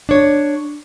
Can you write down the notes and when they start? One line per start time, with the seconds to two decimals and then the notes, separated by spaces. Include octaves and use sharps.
0.09 D4 C#5